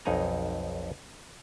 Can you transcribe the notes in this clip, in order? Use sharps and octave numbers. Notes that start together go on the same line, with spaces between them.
B1 F2 D#4 F#5 G#5 A#5